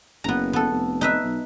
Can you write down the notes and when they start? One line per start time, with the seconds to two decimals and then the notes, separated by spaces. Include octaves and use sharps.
0.24 F#1 B3 A#5
0.53 B3 A4
0.71 F1
1.01 D#4 B4 E5
1.23 B1